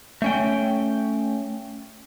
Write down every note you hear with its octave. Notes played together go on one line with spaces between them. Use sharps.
A3 C#4 G5